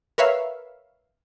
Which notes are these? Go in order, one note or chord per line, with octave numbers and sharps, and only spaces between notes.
A#4 B4 C#5 E5 F5